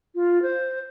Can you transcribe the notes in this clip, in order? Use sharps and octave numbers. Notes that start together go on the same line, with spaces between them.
F4
C5